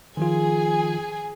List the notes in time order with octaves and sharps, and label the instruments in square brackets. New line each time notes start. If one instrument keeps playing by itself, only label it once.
[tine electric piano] D#3 F3 F4 [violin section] G#4 G#5